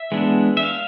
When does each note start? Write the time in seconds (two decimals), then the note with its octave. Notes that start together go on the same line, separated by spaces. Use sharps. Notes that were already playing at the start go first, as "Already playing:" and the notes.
Already playing: E5
0.12 E3 G#3 B3 D4
0.57 E5
0.63 F5